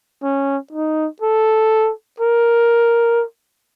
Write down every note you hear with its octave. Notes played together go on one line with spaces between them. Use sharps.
C#4
D#4
A4
A#4